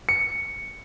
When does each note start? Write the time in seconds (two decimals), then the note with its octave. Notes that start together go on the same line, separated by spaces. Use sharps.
0.09 C#7